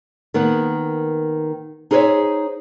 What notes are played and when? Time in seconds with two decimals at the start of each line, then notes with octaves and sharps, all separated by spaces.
0.34 D#3 A#3 B3
1.91 D#4 G#4 A#4 C5 C#5 E5